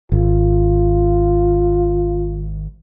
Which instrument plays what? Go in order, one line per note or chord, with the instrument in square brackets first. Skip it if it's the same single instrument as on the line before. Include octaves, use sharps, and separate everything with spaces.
[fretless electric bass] G#1 [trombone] F4